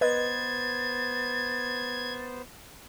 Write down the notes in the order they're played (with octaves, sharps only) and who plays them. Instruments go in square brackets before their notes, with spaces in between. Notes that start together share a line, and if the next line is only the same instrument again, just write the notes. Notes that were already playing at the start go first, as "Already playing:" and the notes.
[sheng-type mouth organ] B3 C5 [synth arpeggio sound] B4 D#5 [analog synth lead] G#6 [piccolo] A6